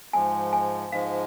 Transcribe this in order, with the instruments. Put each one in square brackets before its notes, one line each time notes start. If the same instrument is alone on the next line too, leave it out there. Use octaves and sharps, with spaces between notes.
[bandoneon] G#2 F3 G#3 [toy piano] G#5
[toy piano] G#5
[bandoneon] G#2 F3 G#3 [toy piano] F5